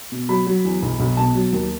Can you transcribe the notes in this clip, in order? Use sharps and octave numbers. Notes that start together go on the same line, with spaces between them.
B2
F#3 B5
F#3
E2
B1
B1
B2 A5
F#3
D#2